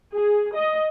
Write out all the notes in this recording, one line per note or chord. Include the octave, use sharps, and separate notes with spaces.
G#4
D#5